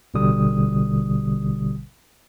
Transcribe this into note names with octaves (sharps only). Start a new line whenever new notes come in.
A1 B2 D3 G3 D#6